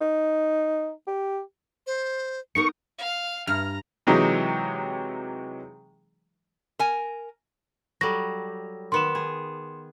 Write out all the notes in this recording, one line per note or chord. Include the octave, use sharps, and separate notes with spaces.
D#4
G4
C5
B3 D#4 A#4 C#6
F5
G2 A#5 F6
C3 E3 F#3 G#3 D#4 G4
A#4 G#5
F#3 G3 A4 A#6
D#3 B3 C6 C#7 E7
G#4